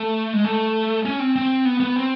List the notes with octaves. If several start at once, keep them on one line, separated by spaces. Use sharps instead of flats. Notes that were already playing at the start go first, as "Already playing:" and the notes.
Already playing: A3
G#3
A3
C#4
C4
C4
B3
B3
C4